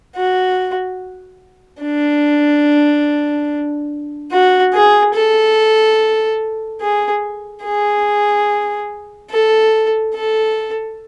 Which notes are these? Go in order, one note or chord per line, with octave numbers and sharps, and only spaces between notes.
F#4
D4
F#4
G#4
A4
G#4
G#4
A4
A4